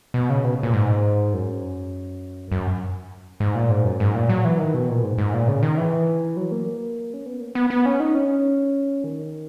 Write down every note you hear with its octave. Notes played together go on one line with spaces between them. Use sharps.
B2
C#3
B2
A#2
G#2
F#2
F#2
G#2
A#2
G#2
F#2
G#2
A#2
F#3
E3
D#3
B2
A#2
G#2
G#2
A#2
C#3
D#3
E3
F#3
A#3
C#4
B3
A#3
B3
B3
C#4
D#4
C#4
D#3